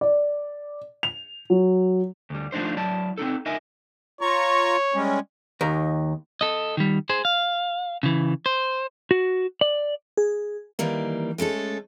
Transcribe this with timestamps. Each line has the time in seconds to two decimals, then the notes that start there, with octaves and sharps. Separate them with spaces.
0.01 D5
1.03 F7
1.50 F#3
2.30 D2 G3
2.52 F3 A3 D4 D#4 C5
2.77 F#3 E4 D5 A5
3.18 C4 C#4 D#4 A4
3.46 D#4 A#4 D#5 E5 G#5
4.21 F4 C#5 A#5 C#6
4.94 G3 G#3 C#4
5.61 D#2 A#4
6.41 A4 D#5
6.77 D#3 G3
7.09 G#4 C5
7.25 F5
8.03 C#3 E3
8.46 C5
9.11 F#4
9.61 D5
10.17 G#4
10.79 D#3 E3 G3 A#3
11.38 G#3 A3 C#4 A4